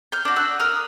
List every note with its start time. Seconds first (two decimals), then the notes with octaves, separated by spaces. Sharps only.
0.12 F6 G6
0.25 D4 F#4
0.36 E6 F#6
0.60 A#3 D#6 F6